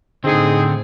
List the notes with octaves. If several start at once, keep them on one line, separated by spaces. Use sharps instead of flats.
A2 D3 C4 D#4 G#4